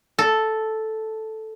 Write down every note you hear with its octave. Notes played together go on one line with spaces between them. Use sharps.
A4